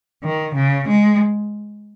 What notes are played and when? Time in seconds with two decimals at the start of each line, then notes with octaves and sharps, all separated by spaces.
0.24 D#3
0.55 C#3
0.88 G#3